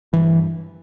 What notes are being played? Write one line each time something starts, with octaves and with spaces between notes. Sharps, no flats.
G2 E3